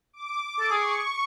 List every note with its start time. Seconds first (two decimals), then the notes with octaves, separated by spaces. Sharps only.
0.13 D6
0.42 D6
0.60 A4
0.70 G#4 C#6